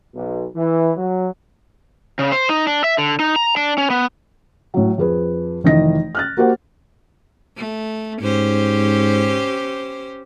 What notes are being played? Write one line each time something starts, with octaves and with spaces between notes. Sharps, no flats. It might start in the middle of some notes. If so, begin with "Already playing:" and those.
B1
E3
F#3
C#3
C5
D#4
D4
E5
D3
D#4
A#5
D4
C#4
B3
A2 F#3
F2 G#4 B4
F1 D#3 E3 D#5 A#6
F6 F#6 A6
A#3 F#4 G4 A#4 C5 F#5
A3
G#2 C#4 G4 C5